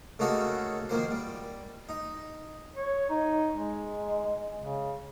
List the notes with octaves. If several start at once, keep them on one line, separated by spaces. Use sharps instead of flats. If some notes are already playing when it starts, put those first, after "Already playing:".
C#3 A3 A#3 D#4 F#4 A4
D#3 F3 A#3 C5
G3
D#4
C#5
D#4
G#3
C#3